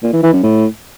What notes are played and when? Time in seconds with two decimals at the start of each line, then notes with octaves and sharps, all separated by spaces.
0.03 A#2
0.13 E3
0.23 E3
0.33 F#2
0.43 A2